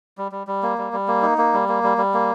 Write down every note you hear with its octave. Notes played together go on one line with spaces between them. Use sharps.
G3
G3
G3
A#3
G3
G3
A#3
D#4
A#3
G3
A#3
G3
G3
A#3